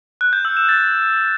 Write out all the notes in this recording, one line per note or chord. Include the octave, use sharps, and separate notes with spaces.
F#6
G6
E6
E7
A6